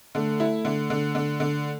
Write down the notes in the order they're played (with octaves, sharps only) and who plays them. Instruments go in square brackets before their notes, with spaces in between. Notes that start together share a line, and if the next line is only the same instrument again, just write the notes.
[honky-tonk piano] D3 [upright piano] A3
[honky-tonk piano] E4
D3
D3
D3
D3